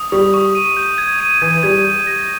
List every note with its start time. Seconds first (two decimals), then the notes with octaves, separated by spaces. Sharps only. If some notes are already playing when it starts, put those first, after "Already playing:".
Already playing: D#6
0.12 G3 C#6
0.34 C#6
0.55 D#7
0.77 G6
0.98 G#6
1.20 D#7
1.42 E3 G#6
1.63 G3 G#6
1.85 G6
2.07 A#6